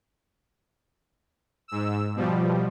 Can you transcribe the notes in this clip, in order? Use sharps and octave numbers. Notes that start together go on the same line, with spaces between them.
G#2 E6
B2 F3 G3